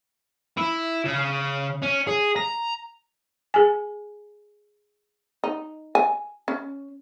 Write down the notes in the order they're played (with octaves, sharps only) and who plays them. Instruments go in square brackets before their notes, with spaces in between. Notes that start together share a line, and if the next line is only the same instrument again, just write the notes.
[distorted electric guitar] E4
C#3
C#4
G#4
A#5
[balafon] G#4 G#5
[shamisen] D#4
G#5
C#4